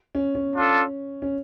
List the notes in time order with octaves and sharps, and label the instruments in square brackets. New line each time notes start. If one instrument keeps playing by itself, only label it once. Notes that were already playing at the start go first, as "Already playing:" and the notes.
[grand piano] C#4
C#4
[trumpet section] D4 F4 A4
[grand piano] C#4